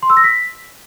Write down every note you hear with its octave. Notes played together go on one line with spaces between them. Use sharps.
C6
E6
A#6
B6